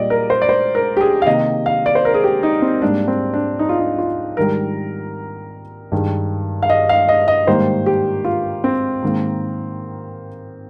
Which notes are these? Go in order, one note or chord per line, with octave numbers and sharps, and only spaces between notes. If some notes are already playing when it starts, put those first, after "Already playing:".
Already playing: A#2 G3 A#3 D5 D#5
A#4
C5
D5
C5
A#4
G4
G#4
F5
C3 D#3 A#3 D#5
F5
D5
C5
A#4
G#4
G4
D#4
C4
G#2 G3 A#3 D4
C4
D4
D#4
F4
D#4
F4
G#2 D#3 G3 A#4
G2 D#3 G#3
F5
D#5
F5
D#5
D#5
G#2 D#3 G3 A#3 C5
G4
F4
C4
G#2 D#3 A#3